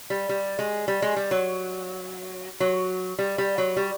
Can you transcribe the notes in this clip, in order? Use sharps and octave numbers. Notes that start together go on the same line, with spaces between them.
G3
G3
G#3
G3
G#3
G3
F#3
F#3
G3
G3
F#3
G3